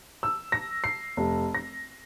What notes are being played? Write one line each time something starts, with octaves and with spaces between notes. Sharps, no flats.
E6
A#6
C7
F1
A#6